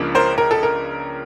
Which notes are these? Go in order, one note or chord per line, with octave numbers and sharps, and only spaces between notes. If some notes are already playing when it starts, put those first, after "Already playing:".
Already playing: C#2 C#3 F3 A#3 D4
A#4 C5
A#4
A4
A#4